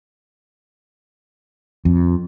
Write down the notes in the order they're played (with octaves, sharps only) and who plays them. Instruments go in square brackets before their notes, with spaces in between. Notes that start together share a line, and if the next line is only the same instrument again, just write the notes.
[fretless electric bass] F2